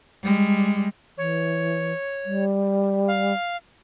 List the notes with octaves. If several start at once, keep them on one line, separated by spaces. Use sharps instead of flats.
G3 G#3
E3 C#5
G3
F5